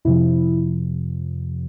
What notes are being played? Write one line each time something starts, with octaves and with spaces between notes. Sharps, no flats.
F2 C3 F3 E4